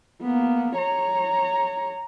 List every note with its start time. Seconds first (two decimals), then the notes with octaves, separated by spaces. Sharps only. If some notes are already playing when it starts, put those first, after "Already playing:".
0.22 A#3 B3
0.77 C#5 A#5